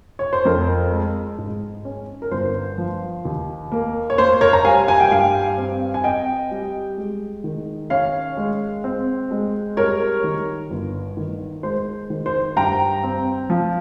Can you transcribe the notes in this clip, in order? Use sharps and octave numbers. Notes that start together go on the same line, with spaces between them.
C#5
C5
F2 A#4
G#3
G#2
C#4
A#4
G1 C5
F3
D#2
A#3
C#5
A#3 C5
A#4 C#5
A#5
G3 F5 G#5
G#5
G5
G2 F5 G#5
C4
G#5
C4 D#5 G5
G3
G#3
D#3
C#4 C#5 F5
G#3
C4
G#3
G3 A#4 C#5
D#3
G1
D#3
G#3 C5
D#3
C5
G2 G5 A#5
C4
F3